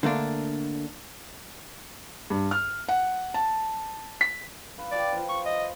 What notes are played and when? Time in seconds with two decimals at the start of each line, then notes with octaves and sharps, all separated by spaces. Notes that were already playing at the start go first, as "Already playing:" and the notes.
0.03 D3 A3 A#3 D4
2.30 G2
2.51 F6
2.89 F#5
3.34 A5
4.21 B6
4.78 B4 F5
4.92 D5 G5 A5 D6
5.13 F3 C5
5.29 C#6
5.46 D#5